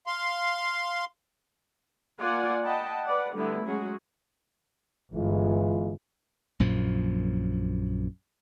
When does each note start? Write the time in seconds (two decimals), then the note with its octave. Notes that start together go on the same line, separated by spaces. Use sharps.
0.07 F5 C6
2.21 A#3 F4 D5 F#5 G#5
2.64 D#5 F#5 G5 A5 B5
3.04 B4 D5 F#5
3.34 D3 G3 A3 B3 E4
3.66 F#3 G#3 C#4 F#4 G#4
5.13 G1 E3 G#3 F4
6.60 A#1 F#2 A#2 F3